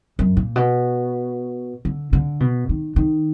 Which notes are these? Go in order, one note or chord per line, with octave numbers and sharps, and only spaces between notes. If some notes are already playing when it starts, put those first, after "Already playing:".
F#2
A#2
B2
D3
D3
B2
D#3
D#3